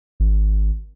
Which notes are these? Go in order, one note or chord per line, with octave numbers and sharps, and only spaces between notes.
G#1